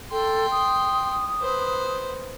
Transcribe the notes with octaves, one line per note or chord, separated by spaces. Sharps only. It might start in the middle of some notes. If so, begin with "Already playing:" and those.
A4 G5 C6
D#6
B4 C5